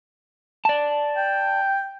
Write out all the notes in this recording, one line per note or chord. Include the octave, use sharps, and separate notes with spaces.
D5 A5
G5